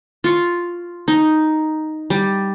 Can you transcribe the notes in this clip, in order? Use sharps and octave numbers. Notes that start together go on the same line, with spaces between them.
F4 C#6
D#4
G3